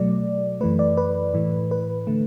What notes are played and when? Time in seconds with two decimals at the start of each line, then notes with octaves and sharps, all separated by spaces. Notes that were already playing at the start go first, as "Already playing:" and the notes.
Already playing: B2 F#3 A3 D5
0.61 F#2 E3 A3 B4
0.79 D5
0.97 B4
1.34 A2 E3 A3
1.71 B4
2.07 D3 A3